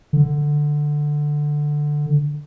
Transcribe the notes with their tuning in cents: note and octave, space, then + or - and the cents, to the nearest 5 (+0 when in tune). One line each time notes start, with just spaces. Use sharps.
D3 +10